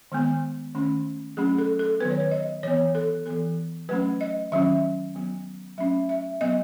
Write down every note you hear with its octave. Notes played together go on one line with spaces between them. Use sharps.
D#3 G#3 B3
D#3 A3 C#4
F#3 A3 C#4 G#4
A4
A4
D#3 F#3 B3 B4
C#5
B4
D#5
E3 B3 C#5
A4
E3 B3 A4
F#3 A3 C#4 B4
D#5
D#3 F#3 C#4 E5
F#3 B3
F#3 A3 C#4 E5
E5
F#3 B3 D#5